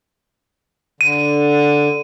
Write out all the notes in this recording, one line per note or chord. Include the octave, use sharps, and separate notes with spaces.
D3 D#7